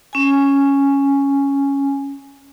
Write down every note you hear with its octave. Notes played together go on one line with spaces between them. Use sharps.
C#4 G#5